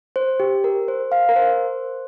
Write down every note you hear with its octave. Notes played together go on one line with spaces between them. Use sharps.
C5
G4
A#4
C5
F5
A#4
C5